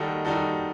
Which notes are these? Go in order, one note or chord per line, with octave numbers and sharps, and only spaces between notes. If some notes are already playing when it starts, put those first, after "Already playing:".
Already playing: D#3 G3 D#4 F#4 A4
D#3 G3 D#4 F#4 A4